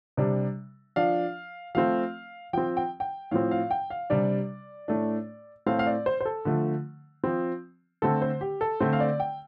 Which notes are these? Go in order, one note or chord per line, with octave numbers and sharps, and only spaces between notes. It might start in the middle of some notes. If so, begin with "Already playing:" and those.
C3 G3 D4
F3 D4 F5
F3 A3 C4 F5
F3 C4 G5
G5
G5
A2 F3 C4 F5
F5
G5
F5
C3 G3 D4 D5
A2 A3 D4
A2 A3 C4 F5
F5
D5
C5
C5
A4
D3 F3 A3
F3 C4
D3 A3 C4 A4
C5
G4
A4
D3 A3 C4 C5
F5
D5
G5